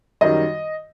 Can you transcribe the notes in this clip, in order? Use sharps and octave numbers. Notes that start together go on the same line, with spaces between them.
F#2 D#3 G3 D#5